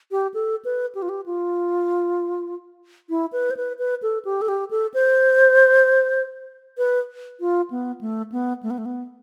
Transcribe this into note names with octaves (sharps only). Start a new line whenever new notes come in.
G4
A4
B4
G4
F4
G4
F4
E4
B4
C5
B4
B4
A4
G4
A4
G4
A4
C5
B4
F4
B3
A3
B3
A3
B3
A3
B3